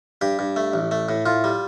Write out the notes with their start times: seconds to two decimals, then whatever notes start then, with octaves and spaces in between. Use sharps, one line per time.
0.21 G2 G4
0.39 G2
0.56 A3
0.73 A1
0.91 A3
1.09 A2
1.26 A2 F4
1.44 G3